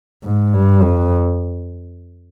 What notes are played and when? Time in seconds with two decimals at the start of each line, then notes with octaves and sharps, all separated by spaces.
0.24 G#2
0.54 G2
0.82 F2